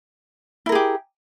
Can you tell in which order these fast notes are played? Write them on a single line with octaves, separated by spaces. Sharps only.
E4 A#4 G#4 G4